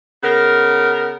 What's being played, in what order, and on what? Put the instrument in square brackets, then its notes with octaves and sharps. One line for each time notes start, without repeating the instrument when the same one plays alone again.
[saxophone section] C#3 B3 A#4